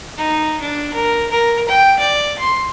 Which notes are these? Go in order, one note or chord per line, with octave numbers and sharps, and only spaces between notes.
D#4
D4
A#4
A#4
G5
D5
C6